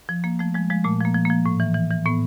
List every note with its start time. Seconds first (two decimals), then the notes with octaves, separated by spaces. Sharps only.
0.09 F3
0.24 F3 A#3
0.39 F3 A3
0.54 F3 G#3
0.70 F3 G#3
0.84 A#2 A3
1.00 F3 A#3
1.14 F3
1.25 F3 A#3
1.46 A2
1.60 E3
1.75 E3
1.91 E3
2.06 A2 B3